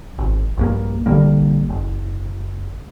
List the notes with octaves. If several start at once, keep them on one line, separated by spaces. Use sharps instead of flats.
G#1
A#1 G2 A#3
A#1 D3 G3 A#3
F#1